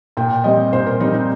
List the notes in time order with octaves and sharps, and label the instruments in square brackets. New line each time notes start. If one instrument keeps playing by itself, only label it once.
[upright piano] A#2 [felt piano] G5
[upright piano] G3 C4 [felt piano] D#5
[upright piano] A#2 [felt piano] C5
[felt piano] A#4
[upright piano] G3 C4 [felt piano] D#4
[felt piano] D#4